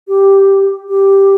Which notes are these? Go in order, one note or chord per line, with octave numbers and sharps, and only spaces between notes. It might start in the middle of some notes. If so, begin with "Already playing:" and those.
G4
G4